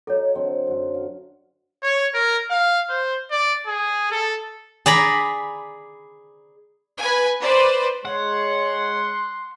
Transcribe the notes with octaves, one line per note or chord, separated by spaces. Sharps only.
F#3 F#4 A4 C#5 D#5
D3 F#3 C4
F#2 F#4
F5
C#5
A#4
F5
C5
D5
G#4
A4
G#4 D5 A#5 B5
B4 G#5
B4 C5 D5
G#3 C#5 F#5 C6